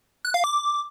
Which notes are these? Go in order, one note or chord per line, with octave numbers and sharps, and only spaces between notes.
F#6
F5
D6